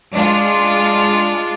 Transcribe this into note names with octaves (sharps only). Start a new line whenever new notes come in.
G#3 D4 F4